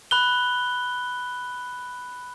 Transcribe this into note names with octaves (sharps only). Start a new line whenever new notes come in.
B5 F#6 G7